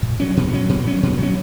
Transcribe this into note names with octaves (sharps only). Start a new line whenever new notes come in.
A#2
F#3 C#4
A#2
F#3 C#4
A#2
F#3 C#4
A#2
F#3 C#4